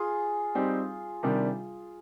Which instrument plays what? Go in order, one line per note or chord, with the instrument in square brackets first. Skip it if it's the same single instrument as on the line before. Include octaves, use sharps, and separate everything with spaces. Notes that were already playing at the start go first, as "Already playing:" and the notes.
Already playing: [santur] F4 G#4
[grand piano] G3 C4 D#4 G4
C3 D#3 G3 D4